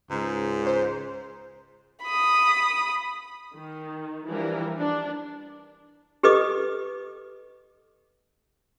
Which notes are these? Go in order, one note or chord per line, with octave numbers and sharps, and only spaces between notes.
C#2 G#2
C5
B5 D#6
D#3
E3 F3 G3 D4 A#4
D4
G4 A4 B4 D#5 D6 D#6